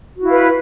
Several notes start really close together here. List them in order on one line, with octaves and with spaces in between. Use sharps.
F#4 E4 F5 B4